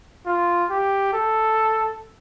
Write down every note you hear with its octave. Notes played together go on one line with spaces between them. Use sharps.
F4
G4
A4